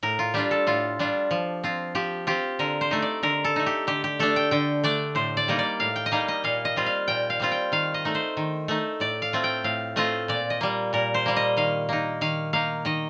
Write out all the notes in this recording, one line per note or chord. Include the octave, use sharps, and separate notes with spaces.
A2 A#4
F4
G3 D4 F4 G4
A4
A2 F4
G3 D4 F4
F3
C4 F4
F3 G4
C4 F4 G4
D3 A#4
C5
A3 D#4
D5
D3 A#4
A4
A3 D#4
G4
D3 G4
G4
A3 D4 A4
G5
D3 G5
A3 D4 D5
A2 C5
D5
G3 A#3 D#4
D5
A2 F5
G5
D#5
G3 A#3 D#4 F5
D#5
A#2 F5
D#5
G3 C4 F4
F5
A#2 G5
F5
G3 C4 F4
G5
D#3 F5
D#5
A3 D#4
C5
D#3
A3 D#4
A2 D5
F5
A3 C4 F4
G5
A2 F5
A3 C4 F4 D#5
A#2 D5
D#5
G3 A#3
A#2 A#4
C5
G3 A#3
D#5
D#3 F5
A#3 D#4
D#3 F5
A#3 D#4 F5
D#3 D#5